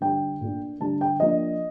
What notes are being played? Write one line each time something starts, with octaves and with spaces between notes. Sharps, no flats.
D3 G3 D4 G5
A#2 A3 D4
D3 G3 D4 A5
G5
F3 A#3 D4 D#5